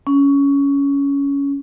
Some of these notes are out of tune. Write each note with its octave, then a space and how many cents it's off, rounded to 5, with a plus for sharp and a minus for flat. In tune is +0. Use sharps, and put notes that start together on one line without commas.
C#4 +15